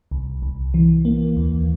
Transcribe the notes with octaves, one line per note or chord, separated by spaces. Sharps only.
C2
C2
E3
A#3
D#2